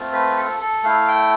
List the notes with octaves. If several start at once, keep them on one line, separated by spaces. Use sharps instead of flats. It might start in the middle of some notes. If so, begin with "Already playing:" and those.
Already playing: A3 C4 F4
B4
A4
A4
A3 E4 F5
G5